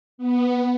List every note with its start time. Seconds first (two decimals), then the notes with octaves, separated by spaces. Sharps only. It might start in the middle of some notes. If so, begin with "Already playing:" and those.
0.18 B3